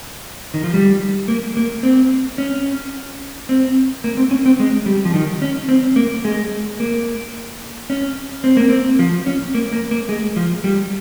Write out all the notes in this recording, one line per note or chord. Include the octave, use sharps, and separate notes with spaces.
D#3
F3
G3
A#3
A#3
C4
C#4
C4
A#3
C4
C#4
C4
G#3
G3
F3
D#3
C#4
C4
A#3
G#3
A#3
C#4
C4
A#3
C4
F3
C#4
A#3
A#3
A#3
G#3
F3
G3